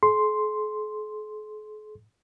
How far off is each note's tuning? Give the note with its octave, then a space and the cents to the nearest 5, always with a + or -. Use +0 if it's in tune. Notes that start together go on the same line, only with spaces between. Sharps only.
G#4 +45 C6 +0